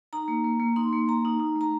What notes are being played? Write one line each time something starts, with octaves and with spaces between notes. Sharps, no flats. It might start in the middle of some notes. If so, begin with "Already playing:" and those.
D#4 A#5
A#3
A#3
A#3
D#4 C6
A#3
A#3 A#5
D#4
D#4
A3
A#5